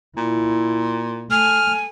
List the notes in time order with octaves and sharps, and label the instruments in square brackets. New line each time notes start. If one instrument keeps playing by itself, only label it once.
[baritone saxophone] A#2 [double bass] E4
[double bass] A3 [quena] G#5 [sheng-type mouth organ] F6